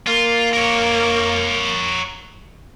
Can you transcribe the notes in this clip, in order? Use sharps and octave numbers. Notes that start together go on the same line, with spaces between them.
A#3 F4
A#4 C#5